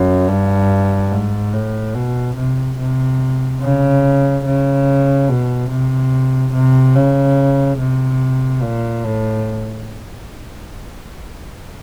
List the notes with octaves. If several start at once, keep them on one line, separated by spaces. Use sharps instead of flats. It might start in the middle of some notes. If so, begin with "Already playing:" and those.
Already playing: F#2
G2
G#2
A2
B2
C3
C3
C#3
C#3
B2
C3
C3
C#3
C3
A#2
A2